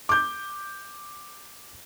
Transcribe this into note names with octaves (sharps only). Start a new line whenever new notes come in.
D6 G6